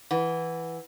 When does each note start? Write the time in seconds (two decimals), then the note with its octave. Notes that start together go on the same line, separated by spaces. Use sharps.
0.11 E3 B4 F#5